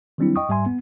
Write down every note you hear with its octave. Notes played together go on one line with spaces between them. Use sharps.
D#3 F#3 G3 C4 D4 E4
D#5 G5 C#6 D#6
G#2 G3 E5 G#5 C6
B3